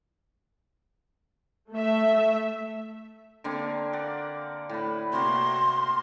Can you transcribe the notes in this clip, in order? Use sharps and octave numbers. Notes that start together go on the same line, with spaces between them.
A3 E5
D3 A#3 C4
D5 F#5
A2 B4
C3 A#3 F#4 C6